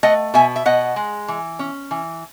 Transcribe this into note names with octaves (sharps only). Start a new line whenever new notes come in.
A3 D#5 F#5
B2 E5 G#5
E5
B2 D#5 F#5
G#3
E3
C#4
E3